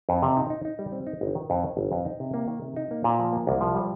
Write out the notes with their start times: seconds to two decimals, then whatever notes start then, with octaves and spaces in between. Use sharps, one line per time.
0.09 F2
0.22 C3
0.37 D#4
0.50 D#4
0.65 D#4
0.79 G3
0.92 C4
1.07 D#4
1.21 G1
1.35 D#3
1.50 F2
1.63 D#3
1.77 G1
1.92 F2
2.05 D#4
2.20 C3
2.34 A#3
2.48 D#3
2.62 C3
2.76 D#4
2.91 A#3
3.04 A#2
3.19 F3
3.33 A#3
3.47 C2
3.61 F3
3.75 G3